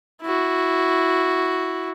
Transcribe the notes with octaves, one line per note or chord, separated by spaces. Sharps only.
E4 F#4